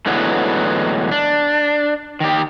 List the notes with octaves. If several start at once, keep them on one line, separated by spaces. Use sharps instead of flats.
A2 D3 E3 F#3 G#3 B3
D4
D#3 G4